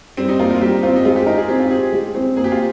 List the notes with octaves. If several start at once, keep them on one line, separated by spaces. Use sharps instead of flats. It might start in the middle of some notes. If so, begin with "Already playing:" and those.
G3 C4
D#4
A#3 F4
A#4
F4
G3 G4
C4 F4
D#4
G#3 F4
G4
D#4 A#4
G#4
C4 G4
F4
G4 G#4
G#3
C4
A#3 G#4
G4
F4